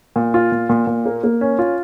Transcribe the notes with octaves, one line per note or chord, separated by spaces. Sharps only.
A#2
F4
A#2
A#2
A#2
A#3
A#3
C#4
F4